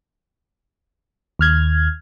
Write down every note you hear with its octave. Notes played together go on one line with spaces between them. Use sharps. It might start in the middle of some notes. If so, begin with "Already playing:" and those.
D#2 F6 G#6